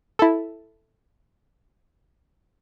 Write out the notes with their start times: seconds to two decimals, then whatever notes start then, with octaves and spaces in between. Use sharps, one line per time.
0.19 E4 A4